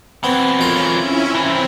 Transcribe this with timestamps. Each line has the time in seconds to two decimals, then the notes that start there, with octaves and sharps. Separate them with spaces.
0.24 E3 F#3 B3 C4
0.59 F2 F4 A#4 C#5 C6
0.93 C#4 E4
1.34 C2 E3 C4